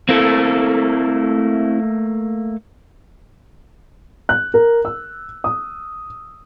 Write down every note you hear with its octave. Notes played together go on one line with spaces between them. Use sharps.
A3 A#3 C4 E4 A4
F#6
A#4
E6
D#6